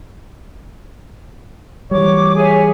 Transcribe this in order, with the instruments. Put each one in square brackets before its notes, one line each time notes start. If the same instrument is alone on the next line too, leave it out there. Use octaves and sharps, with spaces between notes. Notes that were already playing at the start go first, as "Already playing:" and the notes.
[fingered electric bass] E3 G3 [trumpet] C#5 [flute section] D6
[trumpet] G#4 [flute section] C#5 E5 G#5